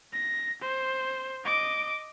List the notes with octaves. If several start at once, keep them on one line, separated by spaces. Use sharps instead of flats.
A#6
C5
D#5 D6